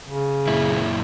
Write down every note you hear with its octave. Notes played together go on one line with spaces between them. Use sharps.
C#3
F#2 A#2 E4